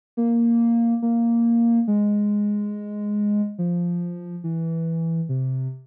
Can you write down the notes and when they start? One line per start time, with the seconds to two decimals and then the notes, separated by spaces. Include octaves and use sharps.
0.17 A#3
1.02 A#3
1.88 G#3
3.59 F3
4.44 E3
5.29 C3